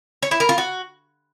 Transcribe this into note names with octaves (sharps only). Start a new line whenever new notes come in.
C#5
E4
A#4
F4
F#4